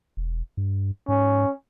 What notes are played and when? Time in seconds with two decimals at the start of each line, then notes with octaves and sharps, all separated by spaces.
0.17 E1
0.57 G2
1.08 G#2 C#4